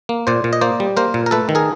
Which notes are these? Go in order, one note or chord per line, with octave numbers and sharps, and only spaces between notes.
A#3
A#2 C5 D5
A#2
D#5
A#3 C5 D5
G3
A#3 A#4 C5
A#2
A#4
A3 A4 B4
D#3
G#4 A#4